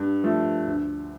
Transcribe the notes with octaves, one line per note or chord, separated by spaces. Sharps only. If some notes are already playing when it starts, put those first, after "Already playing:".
Already playing: G2
F3 A3
D2